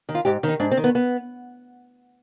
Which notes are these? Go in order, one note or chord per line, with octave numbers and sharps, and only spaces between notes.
D#3
F4
G#2 G4
D#3 D#4
G#2 D4
C4
D#3
B3
B3